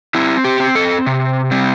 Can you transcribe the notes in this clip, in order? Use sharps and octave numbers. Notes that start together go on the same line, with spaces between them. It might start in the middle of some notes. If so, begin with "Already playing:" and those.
C4 E4
G4
C4
A4
C3
G3 C4